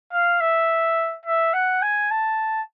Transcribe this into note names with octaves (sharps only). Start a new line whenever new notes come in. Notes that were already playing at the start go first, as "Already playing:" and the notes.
F5
E5
E5
F#5
G#5
A5